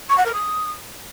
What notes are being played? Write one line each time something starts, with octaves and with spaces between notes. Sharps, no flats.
C#6
F#5
A#4
D#6